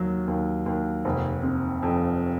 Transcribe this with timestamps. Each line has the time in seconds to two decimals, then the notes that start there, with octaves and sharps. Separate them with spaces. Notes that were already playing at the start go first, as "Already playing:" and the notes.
Already playing: D#2 F#3
0.28 D#2
0.66 D#2
1.05 F1
1.43 C3
1.83 F2